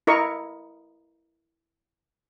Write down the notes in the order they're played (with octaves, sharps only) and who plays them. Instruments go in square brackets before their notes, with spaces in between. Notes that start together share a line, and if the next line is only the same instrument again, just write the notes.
[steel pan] E4 A#4 D#5 C#6